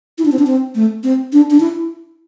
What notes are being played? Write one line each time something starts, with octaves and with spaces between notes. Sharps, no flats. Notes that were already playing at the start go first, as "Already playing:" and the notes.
E4
D4
C4
D4
C4
A3
C4
D4
D4
E4